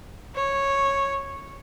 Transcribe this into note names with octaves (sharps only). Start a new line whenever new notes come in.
C#5